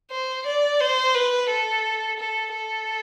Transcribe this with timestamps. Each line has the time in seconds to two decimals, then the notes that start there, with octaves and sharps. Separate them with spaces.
0.11 C5
0.46 D5
0.80 C5
1.15 B4
1.50 A4
2.19 A4
2.54 A4